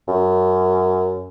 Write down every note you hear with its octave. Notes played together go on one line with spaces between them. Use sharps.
F#2